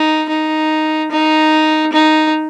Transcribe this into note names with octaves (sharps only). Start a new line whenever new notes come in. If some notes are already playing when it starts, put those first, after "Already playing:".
Already playing: D#4
D#4
D#4
D#4